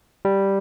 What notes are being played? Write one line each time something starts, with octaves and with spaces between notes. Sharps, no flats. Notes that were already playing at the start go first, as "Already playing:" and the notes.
G3